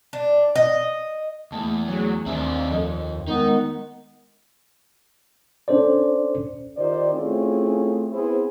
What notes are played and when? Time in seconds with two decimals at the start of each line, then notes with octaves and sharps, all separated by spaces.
0.13 D4
0.55 D#5
1.52 E2 A3 A#3 A5
1.88 F#3 A3 G#4
2.26 D#2 C4 D4 E5 G#5
2.70 F2 F3 A4 D#5
3.27 D#3 G#3 B3 D#4
5.68 C#4 D4 A4 C5 D5
6.76 D#3 F4 G4 C5 D5
7.12 A3 C4 C#4 E4 F4 G#4
8.12 B3 C4 E4 G#4 C5